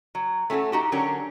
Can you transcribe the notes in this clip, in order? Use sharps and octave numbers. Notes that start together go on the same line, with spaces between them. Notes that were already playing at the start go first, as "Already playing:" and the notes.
F#3
A3 C#4 F#4 G#4 A4
D#4 F#4 G4
D3 F#3 C#4 D4 G4 A#4